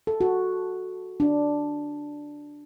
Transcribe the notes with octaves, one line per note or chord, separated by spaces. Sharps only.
A4
F#4
D4